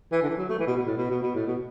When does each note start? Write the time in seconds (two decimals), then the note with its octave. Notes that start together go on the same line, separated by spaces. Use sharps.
0.12 E3
0.22 D3
0.30 E3
0.37 F#3
0.49 A3
0.59 E3
0.67 B2
0.77 B2
0.86 A2
0.97 B2
1.10 B2
1.22 B2
1.35 A2
1.46 B2